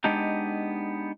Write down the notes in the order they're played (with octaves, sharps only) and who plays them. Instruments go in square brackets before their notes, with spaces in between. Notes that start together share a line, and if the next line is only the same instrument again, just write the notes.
[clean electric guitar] G#3 B3 D4 D#4 G4